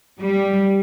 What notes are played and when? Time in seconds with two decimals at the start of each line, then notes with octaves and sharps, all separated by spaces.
0.21 G3